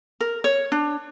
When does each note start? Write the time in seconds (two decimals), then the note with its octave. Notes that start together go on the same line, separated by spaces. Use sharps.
0.20 A#4
0.44 C#5
0.72 D4